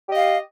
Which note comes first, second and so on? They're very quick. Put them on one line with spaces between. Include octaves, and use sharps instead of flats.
G4 D#5 F5